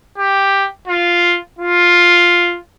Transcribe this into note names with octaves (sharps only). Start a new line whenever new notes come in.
G4
F4
F4